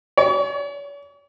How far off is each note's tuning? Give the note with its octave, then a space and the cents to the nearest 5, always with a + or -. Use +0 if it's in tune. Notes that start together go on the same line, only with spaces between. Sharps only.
C#5 +45